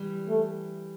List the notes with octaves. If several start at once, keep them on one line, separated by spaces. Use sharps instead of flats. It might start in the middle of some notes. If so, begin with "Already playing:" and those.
Already playing: E3 G3
A3